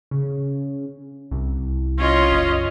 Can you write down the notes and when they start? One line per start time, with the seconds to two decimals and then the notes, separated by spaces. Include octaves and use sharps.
0.11 C#3
1.31 C2
1.97 C#4 F4 D#5
2.32 F#1